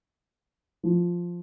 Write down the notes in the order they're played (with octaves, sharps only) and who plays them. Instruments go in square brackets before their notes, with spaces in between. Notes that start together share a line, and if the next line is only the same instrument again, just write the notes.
[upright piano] F3